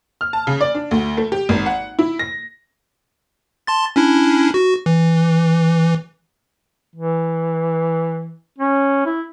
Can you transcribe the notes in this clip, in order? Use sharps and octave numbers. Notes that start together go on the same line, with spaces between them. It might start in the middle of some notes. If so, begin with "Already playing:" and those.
F6
A5
C#3
D5
D4
D2
A3
G4
G#1
F#5
E4
A#6
A5 C6 A6
C#4 D4 E4
F#4
E3
E3
C#4
E4